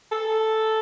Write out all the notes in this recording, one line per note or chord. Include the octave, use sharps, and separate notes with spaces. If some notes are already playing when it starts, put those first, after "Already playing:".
A4